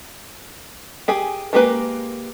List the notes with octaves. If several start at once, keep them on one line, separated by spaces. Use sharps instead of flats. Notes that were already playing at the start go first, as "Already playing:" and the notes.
G4 G#4 G#5
G#3 A#3 G4 A#4 B4